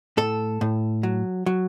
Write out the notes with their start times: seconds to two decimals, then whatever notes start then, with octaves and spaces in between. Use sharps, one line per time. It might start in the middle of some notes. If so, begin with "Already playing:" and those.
0.17 A2 A4
0.61 A2
1.03 F#3
1.46 F#3